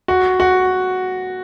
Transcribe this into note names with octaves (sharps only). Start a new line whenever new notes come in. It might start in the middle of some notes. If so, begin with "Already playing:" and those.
F#4
F#4